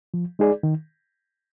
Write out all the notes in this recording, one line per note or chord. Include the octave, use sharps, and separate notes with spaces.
F3
G#3 D#4 G#4 D5
D#3